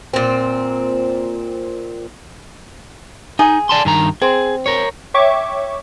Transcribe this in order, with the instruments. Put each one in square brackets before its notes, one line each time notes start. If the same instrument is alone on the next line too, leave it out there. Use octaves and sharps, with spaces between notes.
[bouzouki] A#2 C4
[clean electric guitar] D#4 [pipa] G#4
[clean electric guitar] D5 A5 C6
G2 D#3 A#5
[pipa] C4 [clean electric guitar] G#4
[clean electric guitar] A#4 C#5
[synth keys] C#5 E5 G5 C#6 D6